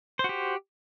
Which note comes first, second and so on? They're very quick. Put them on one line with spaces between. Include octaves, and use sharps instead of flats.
C5 F#4 G4